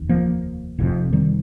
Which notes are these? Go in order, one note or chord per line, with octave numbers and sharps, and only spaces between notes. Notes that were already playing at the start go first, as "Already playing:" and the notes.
Already playing: F1 D#2
F3 A#3
F1 F2 C3
D#3 G3